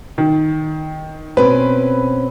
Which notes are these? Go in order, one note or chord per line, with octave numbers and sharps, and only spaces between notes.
D#3
B2 C4 C#4 B4